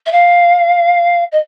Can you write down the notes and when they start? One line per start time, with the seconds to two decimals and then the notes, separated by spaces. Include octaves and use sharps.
0.05 E5
0.11 F5
1.31 D#5